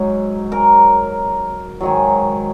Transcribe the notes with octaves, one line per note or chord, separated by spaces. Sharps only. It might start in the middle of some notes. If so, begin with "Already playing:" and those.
Already playing: G#2 F#3
A#4
G#2 D#3 F#3